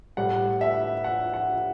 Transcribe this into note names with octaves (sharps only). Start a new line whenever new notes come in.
A2 G3 F#5
E5
F#5
F#5